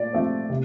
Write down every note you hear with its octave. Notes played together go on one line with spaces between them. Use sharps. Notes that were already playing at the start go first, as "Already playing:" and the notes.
Already playing: A#2 A3 D5
F3 A3 C4
C3